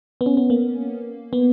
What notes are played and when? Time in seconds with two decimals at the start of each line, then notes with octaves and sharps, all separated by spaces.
0.21 B3
0.26 C#4
0.37 B3
0.50 A#3
1.33 B3